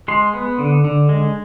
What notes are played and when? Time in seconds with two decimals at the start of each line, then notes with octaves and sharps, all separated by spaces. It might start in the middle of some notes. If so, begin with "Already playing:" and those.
0.08 G#3 C6
0.34 B3
0.59 D3
0.84 D3
1.09 G#3